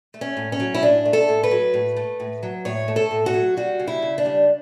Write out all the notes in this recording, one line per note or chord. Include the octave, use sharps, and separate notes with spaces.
A3
C#4
A2
C#4
F#3
E4
A2 D4
A3
A4
A2
B4
F#3
A2
A3
A2
F#3
A2 C#5
A3
A4
A2
F#4
F#3
G3 F#4
C#3
E4
C#3
D4
G3